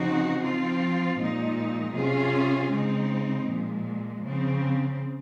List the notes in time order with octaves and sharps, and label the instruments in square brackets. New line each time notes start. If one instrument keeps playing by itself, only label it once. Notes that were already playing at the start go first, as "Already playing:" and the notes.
Already playing: [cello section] C#3 F3 C4 D#4 F#4
F3 C4 F4
A#2 F3 G#3 D#4
C3 F#3 C#4 F4 G#4
C#3 G#3 C4 D#4
A#2 F3 G#3
C#3 F3 C4